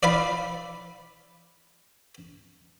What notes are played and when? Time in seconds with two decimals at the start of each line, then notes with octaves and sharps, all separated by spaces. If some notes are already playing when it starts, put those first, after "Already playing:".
0.03 D5 E5 F5 B5